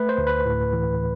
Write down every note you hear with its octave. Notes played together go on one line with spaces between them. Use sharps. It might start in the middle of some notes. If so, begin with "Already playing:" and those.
Already playing: A3 B4
C5
D2
B4
A2
E3